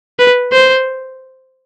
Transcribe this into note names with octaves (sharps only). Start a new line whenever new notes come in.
B4
C5